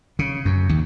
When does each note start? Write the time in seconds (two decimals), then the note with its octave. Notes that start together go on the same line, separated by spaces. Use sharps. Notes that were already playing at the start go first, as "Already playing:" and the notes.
0.19 C#3
0.45 F#2
0.69 D#2